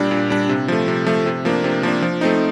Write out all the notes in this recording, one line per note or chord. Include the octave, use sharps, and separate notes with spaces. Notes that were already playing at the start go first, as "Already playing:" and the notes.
Already playing: A#2 G3 D4
A#2
G3 D4
C3
F3 A3
C3
F3 A3
C3
F3 A#3 D4
C3
F3 A#3 D4
F3
A3 C4 D#4